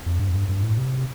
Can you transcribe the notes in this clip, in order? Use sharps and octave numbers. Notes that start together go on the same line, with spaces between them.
F2
G2
F2
G2
G2
A2
C3